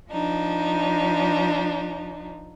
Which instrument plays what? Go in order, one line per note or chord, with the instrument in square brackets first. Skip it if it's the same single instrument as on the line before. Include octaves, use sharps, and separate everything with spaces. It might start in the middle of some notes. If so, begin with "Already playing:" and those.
[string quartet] F3 D4 D#4